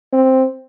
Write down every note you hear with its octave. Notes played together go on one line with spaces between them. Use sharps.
C4